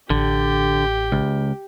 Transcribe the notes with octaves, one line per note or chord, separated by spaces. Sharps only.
A1 D3 G4
C#2